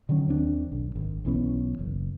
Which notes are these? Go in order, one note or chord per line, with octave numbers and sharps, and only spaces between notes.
D3 D#3 F#3 C#4
D#2 C4 D4
B1
G#1
B1 E3 B3 C#4
F#1